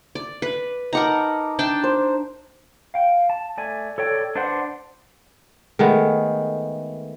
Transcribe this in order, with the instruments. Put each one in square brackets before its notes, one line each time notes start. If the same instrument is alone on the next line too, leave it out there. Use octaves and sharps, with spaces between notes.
[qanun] D5
B4
[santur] D#4 A5 D6 [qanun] A#4 F#5 A#5
[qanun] D4 G5 A5
[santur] C5
[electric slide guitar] F5 G5
A5
A3 D5 G#5
A4 C#5 D5 G5
D4 B4 C5 D5 F#5
[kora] D#3 G#3 A3 B3